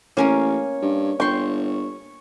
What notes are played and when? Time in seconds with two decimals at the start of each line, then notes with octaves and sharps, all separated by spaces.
0.17 A1 A#3 C#4 A#4 C#5
0.82 G2
1.20 G1 G5 C6 C#6